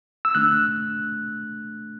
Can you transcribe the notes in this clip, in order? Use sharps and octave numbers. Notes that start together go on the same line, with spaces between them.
E6
D3 A3 D4 F#6